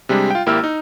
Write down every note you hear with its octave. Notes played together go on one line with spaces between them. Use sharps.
C3 G3 G#3 D4
F4 G5
G#1 A#3 E4 G4 E6 F6
D#4